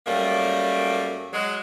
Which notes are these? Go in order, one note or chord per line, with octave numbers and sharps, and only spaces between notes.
F#2 G3 A3 A#3
F#3 G#3